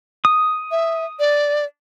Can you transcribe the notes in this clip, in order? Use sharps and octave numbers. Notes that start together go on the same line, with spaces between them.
D#6
E5
D5